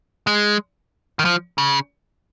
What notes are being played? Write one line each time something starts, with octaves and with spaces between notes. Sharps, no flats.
G#3
D#3
F3
C#3